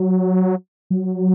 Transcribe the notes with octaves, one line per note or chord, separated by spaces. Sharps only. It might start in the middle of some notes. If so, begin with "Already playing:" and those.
Already playing: F#3
F#3